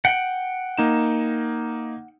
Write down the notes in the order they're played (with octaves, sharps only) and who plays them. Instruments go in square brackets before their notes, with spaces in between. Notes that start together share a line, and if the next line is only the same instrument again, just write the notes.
[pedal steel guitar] F#5 G5
[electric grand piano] A#3 D#4 E7